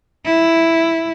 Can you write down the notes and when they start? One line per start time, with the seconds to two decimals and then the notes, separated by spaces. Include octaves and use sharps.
0.26 E4